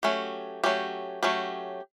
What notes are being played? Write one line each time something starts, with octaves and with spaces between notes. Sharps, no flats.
F#3 A3 C#4 G4
F#3 A3 C#4 G4
F#3 A3 C#4 G4